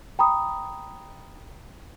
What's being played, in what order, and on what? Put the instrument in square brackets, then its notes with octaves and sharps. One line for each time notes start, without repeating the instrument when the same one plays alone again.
[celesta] G5 A#5 B5 D#6